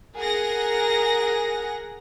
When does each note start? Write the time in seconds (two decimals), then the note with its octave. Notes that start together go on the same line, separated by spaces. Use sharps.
0.17 G#4 A#4 F#5 A#6